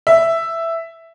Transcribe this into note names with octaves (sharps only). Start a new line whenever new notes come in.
E5